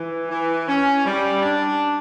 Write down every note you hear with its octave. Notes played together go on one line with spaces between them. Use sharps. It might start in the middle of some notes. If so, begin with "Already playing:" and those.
Already playing: E3
E3
C#4
G3
D4